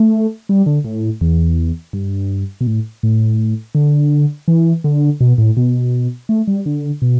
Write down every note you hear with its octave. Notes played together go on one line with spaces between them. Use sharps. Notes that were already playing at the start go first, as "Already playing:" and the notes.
Already playing: A3
G3
D3
A2
E2
G2
B2
A2
A2
D3
E3
D3
B2
A2
B2
A3
G3
D3
B2